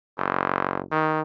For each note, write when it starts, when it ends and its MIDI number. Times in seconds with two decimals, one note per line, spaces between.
0.18 0.81 30
0.92 1.21 51